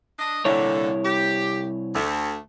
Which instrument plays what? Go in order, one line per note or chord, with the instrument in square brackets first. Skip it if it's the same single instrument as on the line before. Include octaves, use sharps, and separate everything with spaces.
[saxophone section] D4 D#5
[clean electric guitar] C2 E4 C#5 [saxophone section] A#2 D3
[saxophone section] G4
D2 A3